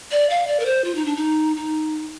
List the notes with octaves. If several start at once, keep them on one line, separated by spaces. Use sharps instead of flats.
D5
F5
D5
A#4
C5
F4
D#4
D4
D#4
D#4